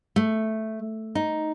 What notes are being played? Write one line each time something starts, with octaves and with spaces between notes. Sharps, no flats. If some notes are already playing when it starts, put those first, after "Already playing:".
A3
D#4